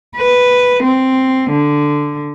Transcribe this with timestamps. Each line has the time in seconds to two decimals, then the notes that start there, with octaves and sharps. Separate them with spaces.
0.16 B4
0.83 C4
1.50 D3